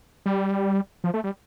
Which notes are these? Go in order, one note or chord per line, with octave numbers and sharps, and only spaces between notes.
G3
F3
A3
G3